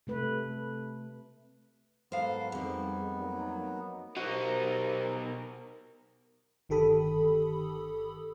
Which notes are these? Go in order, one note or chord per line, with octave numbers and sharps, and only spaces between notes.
C3 A3 B4
G#2 F#3 B3 A4 A#4 C5 F5
F2 G3 D#4 G#4
F#3 A#3 D#4
B2 D#4 F#4 G4 A#4 C5
G1 D#3 G4 A4 B5 D#6